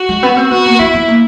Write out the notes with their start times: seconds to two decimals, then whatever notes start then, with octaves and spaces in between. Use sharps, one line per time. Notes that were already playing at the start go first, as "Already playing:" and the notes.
Already playing: F#4
0.09 G#3
0.23 B3
0.37 C4
0.51 B3 F#4
0.66 A#3
0.80 B3 E4
0.94 B3
1.08 A#3